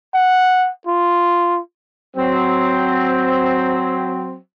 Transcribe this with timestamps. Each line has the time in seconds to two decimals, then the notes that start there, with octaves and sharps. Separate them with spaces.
0.14 F#5
0.87 F4
2.17 F#3 C4